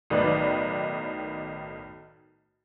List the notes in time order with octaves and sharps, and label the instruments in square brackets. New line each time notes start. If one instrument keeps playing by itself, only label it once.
[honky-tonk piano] B1 A2 D#3 D#4 B4 D5